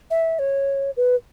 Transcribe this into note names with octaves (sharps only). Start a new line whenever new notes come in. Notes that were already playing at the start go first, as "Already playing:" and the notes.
E5
C#5
B4